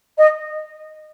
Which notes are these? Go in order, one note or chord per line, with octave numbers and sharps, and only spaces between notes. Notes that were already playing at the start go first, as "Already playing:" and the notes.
D#5